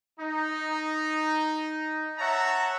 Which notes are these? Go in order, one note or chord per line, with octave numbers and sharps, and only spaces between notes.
D#4
C#5 E5 F#5 A5 A#5